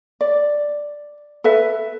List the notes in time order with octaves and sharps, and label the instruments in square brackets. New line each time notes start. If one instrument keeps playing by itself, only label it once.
[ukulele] D5
A4 B4 E5